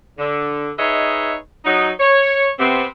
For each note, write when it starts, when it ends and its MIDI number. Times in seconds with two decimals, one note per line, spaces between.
0.19 0.71 50
0.79 1.35 63
0.79 1.35 68
0.79 1.35 71
0.79 1.35 73
0.79 1.35 75
0.79 1.35 76
1.65 1.91 54
1.65 1.91 63
2.00 2.49 73
2.59 2.85 48
2.59 2.85 59
2.59 2.85 60